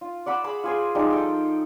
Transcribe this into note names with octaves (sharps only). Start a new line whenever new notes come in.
F4
D5 F#5 B5 E6
G#4 B5 D6
F4 G#4 C5
F3 G3 G#3 D#4
A4 D#5 G5